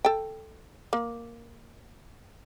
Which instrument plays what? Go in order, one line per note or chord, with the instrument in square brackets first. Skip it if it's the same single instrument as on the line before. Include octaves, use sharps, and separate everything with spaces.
[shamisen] A4 G5
A#3